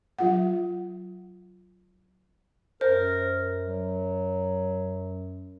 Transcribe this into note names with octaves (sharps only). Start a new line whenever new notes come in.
F#3 F4 F#5
F#2 A#4 C5
F#3